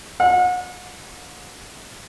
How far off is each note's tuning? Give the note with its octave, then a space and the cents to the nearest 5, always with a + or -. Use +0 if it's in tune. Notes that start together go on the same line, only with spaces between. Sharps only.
F#5 -35